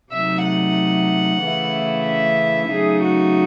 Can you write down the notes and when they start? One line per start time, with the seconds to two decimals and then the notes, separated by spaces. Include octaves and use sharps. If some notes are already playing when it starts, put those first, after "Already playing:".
0.12 C3 F#3 A3 D#4 E5
0.45 F#5
1.42 C#3 E3 A3 C#4 E4
2.07 E5
2.71 C#3 F#3 A3 D#4 G#4
3.04 F#4